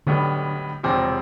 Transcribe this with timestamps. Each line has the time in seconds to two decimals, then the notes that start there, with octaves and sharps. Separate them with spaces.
0.06 B1 A2 D3 G3 B3
0.83 E1 E2 C3 F3 C4